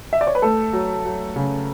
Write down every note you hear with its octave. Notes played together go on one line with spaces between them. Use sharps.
E5
D5
C#5
B4
A3 A4
F#3
F#3
C#3